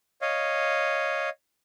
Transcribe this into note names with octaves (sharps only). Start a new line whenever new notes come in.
C#5 D#5 F5